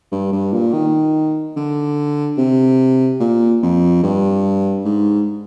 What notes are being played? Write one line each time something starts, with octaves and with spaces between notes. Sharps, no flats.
G2
G2
A#2
D#3
D3
C3
A#2
F2
G2
G#2